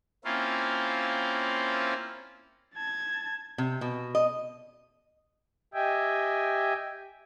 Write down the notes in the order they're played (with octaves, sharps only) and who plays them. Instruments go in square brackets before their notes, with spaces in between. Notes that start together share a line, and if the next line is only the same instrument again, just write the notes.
[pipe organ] A#3 C4 C#4 E4 F4
[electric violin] A5 G#6
[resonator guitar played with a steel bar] C3
B2
D#5
[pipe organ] G4 D#5 E5 G5 G#5